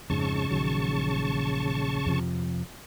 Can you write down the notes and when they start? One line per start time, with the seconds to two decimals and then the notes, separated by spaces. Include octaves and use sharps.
0.10 F2 G#2 C#3 A5 C#6
0.51 A#1 D#3 F#3
2.06 F2 C3 F3